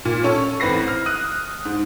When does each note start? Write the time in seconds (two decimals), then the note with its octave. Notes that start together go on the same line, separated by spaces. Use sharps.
0.05 A#2
0.23 C#4 A4 C#5
0.60 A1 C4 B4 A#6 C7
0.88 F6
1.06 D#6 F#6 D#7
1.65 G#2